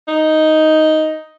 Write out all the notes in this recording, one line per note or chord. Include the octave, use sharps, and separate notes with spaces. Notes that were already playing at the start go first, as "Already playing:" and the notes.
D#4